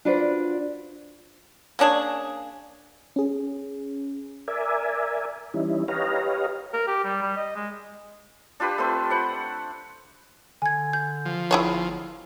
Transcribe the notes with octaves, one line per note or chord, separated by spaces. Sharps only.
D4 F4 F#4 B4 C5 D5
A#3 C#4 D4 G#4
C#4 G#4
A#4 D5 E5 G#5
E3 G3 C#4 D#4 E4
G4 B4 C#5 D#5 F5 A#5
A#4
G4
G3
G3
D#5
G#3
D4 F4 G4 B4
A3 C4 B4
C5 F#5 B5
D3 G#5 G#6
G6
F3
G1 E4 G#4 C#5